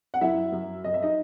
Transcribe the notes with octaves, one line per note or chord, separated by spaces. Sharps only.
F#5
F#2 E4 E5
F#2
F#2 D#5
E5
D#4 D#5